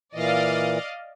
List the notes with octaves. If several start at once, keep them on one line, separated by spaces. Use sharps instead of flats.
A#2 E3 D5 D#5 F5